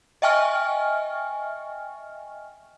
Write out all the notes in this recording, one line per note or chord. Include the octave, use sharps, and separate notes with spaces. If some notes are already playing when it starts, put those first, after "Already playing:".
D#5 E5 G5 G#5 C#6 F6